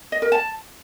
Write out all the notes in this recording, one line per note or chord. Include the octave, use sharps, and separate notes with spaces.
D#5
A#4
A5